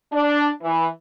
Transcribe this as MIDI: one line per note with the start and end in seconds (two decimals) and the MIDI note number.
0.12 0.47 62
0.62 0.85 52